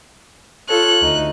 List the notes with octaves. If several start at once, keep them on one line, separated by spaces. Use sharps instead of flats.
F4 A4 C#5 F#6
D2 D#4